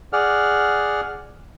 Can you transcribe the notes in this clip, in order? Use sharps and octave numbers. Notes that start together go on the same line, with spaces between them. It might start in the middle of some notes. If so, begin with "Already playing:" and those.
G#4 D5 F#5 F6